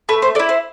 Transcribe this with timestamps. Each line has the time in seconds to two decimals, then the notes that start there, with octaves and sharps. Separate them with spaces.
0.09 A3 B4
0.22 C5
0.35 A4 D5
0.39 E4
0.49 C5